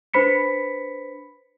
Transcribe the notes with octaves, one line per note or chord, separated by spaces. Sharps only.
D4 B4 C5 B5 B6 C#7